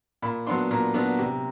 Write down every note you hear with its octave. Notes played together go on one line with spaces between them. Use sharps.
A#2 B5
F#3 B3 D4 C6
A#2 A#5
F#3 B3 D4
C3